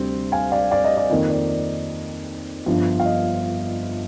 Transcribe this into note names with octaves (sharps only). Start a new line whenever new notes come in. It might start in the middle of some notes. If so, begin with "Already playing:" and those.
Already playing: D2 C3 G3 C4
F5 G#5
D5 F5
D5 F5
D#5
D5
F2 D#3 A#3 D#5
D5
D5
G1 G2 F3
F5
D#5